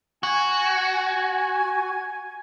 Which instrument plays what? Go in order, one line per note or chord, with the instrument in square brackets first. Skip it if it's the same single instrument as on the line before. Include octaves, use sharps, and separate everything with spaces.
[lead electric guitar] F#4 [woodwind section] G#5